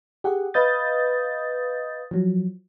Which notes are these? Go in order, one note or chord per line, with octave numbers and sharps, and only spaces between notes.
G4 G#4 F#5
B4 D#5 F5 D#6 G6 A6
F3 F#3